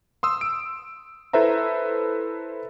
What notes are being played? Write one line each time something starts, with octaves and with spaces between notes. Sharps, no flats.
C6 D#6 E6
D7
E4 A4 B4 C5 E5 A#5